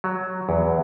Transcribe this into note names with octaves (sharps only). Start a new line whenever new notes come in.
F#3
E2